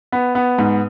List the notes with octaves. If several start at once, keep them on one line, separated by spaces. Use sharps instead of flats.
B3
B3
G#2